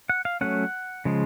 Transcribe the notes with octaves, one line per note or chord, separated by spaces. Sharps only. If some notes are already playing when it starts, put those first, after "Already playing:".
F#5
F5
F#3 A3 C#4 F#5
C#3 F3 G#3